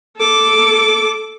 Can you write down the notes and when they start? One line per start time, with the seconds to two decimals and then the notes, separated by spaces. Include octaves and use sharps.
0.18 A4 D6